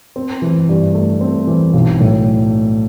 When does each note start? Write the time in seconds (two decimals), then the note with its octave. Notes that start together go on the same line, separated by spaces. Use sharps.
0.16 C4
0.42 E3
0.69 G2
0.94 A3
1.21 C4
1.47 E3
1.73 B1
2.00 A2